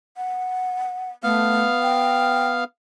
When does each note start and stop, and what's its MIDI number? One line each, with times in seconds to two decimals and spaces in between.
0.17 1.10 78
1.24 1.64 57
1.24 2.64 59
1.24 2.64 77
1.24 2.64 89
1.82 2.49 79